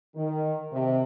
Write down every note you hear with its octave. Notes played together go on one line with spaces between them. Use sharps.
D#3
C3